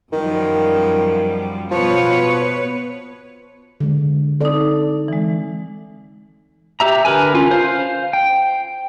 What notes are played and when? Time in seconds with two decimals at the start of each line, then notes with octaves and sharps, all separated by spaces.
0.13 F#2 D#3 F3 G3
1.71 B2 F3 B4 C#5
3.80 D3 G#3
4.41 C4 D#4 A4 D5
5.08 E3 G#3
6.80 G4 E5 A#5
7.05 D3 A#4 B4 G#5
7.34 C#4 F4
7.51 C5 F5
8.13 G5